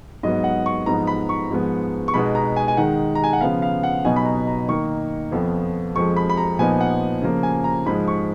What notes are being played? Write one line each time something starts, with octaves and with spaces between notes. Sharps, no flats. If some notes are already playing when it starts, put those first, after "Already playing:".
G#2 F#3 B3 D#5
F#5
C#6
G#2 F3 B3 D#4 A#5
B5
C#6
G#2 F3 G#3 B3
C#6
B2 G#3 B3 D#4 B5
A#5
G#5
G#5
D#3 G#3 D#4 F#5
A#5
G#5
F#5
C#3 F3 B3 F5
F5
F#5
B2 F#3 B3 D#4 G#5
B5
A#5
A#5
D#3 A#3 D#4 C#6
F2 F3 B3 F4
F2 F3 G#3 C#6
B5
B5
A#5
A#2 F3 B3 D#4 G#5
F#5
C#3 F3 A#3 F4
G#5
A#5
G#2 F3 G#3 B5
C#6